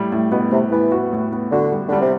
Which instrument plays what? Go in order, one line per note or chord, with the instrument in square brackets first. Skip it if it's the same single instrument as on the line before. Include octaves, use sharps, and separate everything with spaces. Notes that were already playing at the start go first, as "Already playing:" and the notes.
Already playing: [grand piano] A2 G3
A2
[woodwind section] B2 [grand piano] B3
[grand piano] A2 [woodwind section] C3
[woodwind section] E3 [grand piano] B3
[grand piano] F#4
A2
B3
[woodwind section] D3 [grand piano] F#4
[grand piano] G3
[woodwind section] D3 [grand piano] G3
[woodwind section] C3